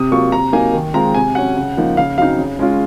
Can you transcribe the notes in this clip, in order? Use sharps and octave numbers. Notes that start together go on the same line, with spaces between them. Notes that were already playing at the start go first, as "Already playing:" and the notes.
Already playing: C3 D#6
F#3 A#3 F4 C#6
C3 A#5
F#3 A#3 D#4 G#5
D#3
G#3 C4 F4 A#5
C3 G#5
F#3 C#4 F#5
C#3
F3 A#3 D#4
C#3 F5
F#3 C4 D#4 F5
C#3
G#3 C#4 F4